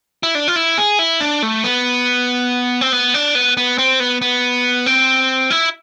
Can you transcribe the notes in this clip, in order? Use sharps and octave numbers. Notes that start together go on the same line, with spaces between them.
E4
D4
F4
E4
G#4
E4
D4
A3
B3
C4
B3
D4
B3
B3
C4
B3
B3
C4
E4